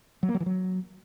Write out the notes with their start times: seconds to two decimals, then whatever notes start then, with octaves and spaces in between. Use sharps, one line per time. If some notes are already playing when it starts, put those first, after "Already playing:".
0.23 F#3
0.29 A#3
0.34 F#3
0.40 E3
0.46 F#3